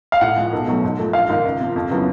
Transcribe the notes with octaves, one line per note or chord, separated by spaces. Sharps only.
F5
A2 F#5
F3 G#3
B1
B2 F#3 A3
G#2
F3 A3
A#1 F5
G#2 D#3
C#2
C3 F3
F2
C#3 F#3 B3 E4